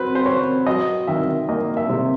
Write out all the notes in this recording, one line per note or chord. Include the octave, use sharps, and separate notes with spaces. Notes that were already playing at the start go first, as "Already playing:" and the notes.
Already playing: F#3 C4 B4
C5
C4 C#5
F#3 D#5
D#3 E5
A#3 D#5
E5
C3